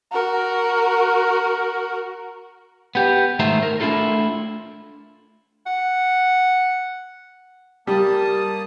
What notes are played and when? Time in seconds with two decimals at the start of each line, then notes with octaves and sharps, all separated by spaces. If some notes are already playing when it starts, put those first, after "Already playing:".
0.11 F#4 A#4
2.95 B3 G4
3.39 G#2 D#3 A3 C5 E5 A#5
3.63 A#4
3.80 A3 D4 E4 F4 A4
5.66 F#5
7.87 G3 A#3 A5 D#6